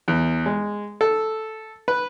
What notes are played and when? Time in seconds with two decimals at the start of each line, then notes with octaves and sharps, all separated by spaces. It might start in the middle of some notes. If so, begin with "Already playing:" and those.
0.08 E2
0.46 G#3
1.01 A4
1.88 B4